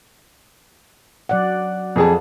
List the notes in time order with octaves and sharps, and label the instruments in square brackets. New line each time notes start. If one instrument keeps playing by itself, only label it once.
[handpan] F#3 D5 F#5
[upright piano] F2 G#4 A5